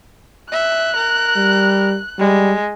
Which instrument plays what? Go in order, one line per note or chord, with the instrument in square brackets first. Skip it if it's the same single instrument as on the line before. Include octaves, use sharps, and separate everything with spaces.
[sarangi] E5 [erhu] F#6
[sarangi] A#4
[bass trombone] G3
[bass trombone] G3 [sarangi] G#3